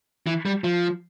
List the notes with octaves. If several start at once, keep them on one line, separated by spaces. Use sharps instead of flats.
E3
G3
F3